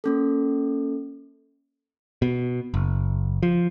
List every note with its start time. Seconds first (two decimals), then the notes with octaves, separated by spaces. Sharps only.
0.04 A#3 C#4 A4
2.22 B2
2.74 F#1
3.43 F3